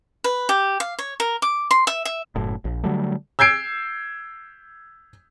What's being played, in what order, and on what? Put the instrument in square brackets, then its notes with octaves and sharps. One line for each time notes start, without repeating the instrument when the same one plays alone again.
[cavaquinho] B4
G4
F5
C#5
A#4
D6
C6
E5
E5
[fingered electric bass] F#1 A2
A#1
D3 F#3 G3 A3
[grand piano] E6 G6 G#6 C7 D7